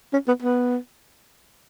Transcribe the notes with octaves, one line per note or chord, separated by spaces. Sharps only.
C#4
B3
B3